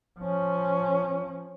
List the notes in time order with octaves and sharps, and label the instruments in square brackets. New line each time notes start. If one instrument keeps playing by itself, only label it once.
[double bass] F3 C#4